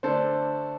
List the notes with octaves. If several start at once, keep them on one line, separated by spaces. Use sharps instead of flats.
D3 A3 D4 A4 C5